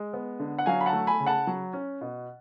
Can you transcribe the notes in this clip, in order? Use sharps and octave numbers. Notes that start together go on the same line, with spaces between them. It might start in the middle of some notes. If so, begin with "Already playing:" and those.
Already playing: G#3
B3
D3
F#5
F#3 F5 G#5
B5
F#5 A5
A3
G#5 B5
C#3
F#5 A5
F#3
C#4
B2